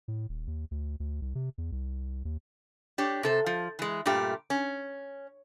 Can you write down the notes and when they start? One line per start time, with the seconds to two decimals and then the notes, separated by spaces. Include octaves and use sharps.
0.08 A2
0.29 D#1
0.47 D#2
0.71 D2
1.00 D2
1.22 C2
1.35 C3
1.58 E2
1.72 C2
2.25 D#2
2.98 D4 G4 C#5
3.23 C3 A4 C5
3.46 F3
3.79 E3 G#3
4.06 G2 A#2 A3 G4
4.50 C#4